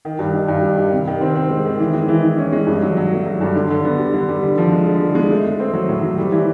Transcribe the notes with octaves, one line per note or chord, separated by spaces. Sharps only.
D#3
G2
D#3
G2
G3
D#3
C3
D#3
C4
C4
G#3
D#3
E3
G#3
E3
E3
C#4
G#3
G2
F#3
F#3
A3
F#3
G2
D3
D3
B3
G3
D3
G3
D3
F3
G#3
D3
G#3
G#3
A3
A3
C4
F#3
A2
F#3
G3
E3